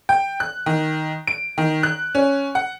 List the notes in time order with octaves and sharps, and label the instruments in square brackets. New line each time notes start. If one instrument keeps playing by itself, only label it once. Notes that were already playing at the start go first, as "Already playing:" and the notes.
[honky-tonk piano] G5
F#6
D#3
D7
D#3
F#6
C#4
F#5